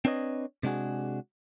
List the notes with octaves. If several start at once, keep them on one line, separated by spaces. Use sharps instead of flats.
C4 D4 B4 C#5 D#5
C3 G#3 D4 F#4 G#4